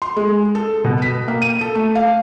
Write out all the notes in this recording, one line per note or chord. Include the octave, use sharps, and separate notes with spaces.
C6
G#3
A4
B2
B6
A#3
D#7
A4
A3
F5